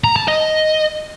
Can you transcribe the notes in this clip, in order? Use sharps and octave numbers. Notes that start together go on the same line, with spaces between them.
A#5
A5
D#5